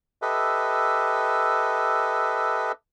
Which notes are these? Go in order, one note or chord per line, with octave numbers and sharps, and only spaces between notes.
G4 A4 B4 D#5 E5